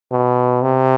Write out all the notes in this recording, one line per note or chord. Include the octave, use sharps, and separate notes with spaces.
B2
C3